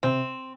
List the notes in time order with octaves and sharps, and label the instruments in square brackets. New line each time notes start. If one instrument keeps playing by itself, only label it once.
[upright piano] C3 [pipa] C4